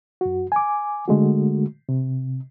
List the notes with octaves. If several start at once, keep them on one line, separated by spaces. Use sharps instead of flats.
F#2 F#4
G#5 D6
D3 G#3 A3 F#4
C3